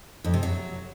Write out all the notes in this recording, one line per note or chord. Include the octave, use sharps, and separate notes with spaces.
F2
C3
F#3